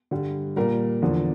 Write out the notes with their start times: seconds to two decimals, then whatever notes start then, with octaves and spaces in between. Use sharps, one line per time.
0.11 G2 D3 G3
0.56 A#2 G3 A#4
1.02 E2 D3 F3